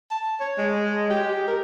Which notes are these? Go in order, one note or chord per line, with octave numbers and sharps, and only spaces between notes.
A5
C#5
G#3
G4
A#4